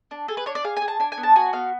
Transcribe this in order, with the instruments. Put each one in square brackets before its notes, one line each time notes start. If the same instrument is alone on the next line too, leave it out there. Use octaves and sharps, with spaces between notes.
[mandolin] D4
G#4 A4
B4
D4 C#5
D5
G#4 F5
G#5
G#4
A5
D4 G#5
G#5
B3
A5
F#4 G#5
B3 F5